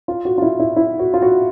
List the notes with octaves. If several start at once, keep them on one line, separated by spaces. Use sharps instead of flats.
F4
F#4
F4
E4
E4
E4
F#4
F4
F#4